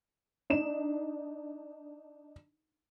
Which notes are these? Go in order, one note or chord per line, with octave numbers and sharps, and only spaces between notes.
D4 D#4 E7